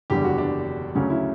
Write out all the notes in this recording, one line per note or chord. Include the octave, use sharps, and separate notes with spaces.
F#1 E2 D3 G3 G4
F#4
D4
D2 C#3 F#3 C#4
E4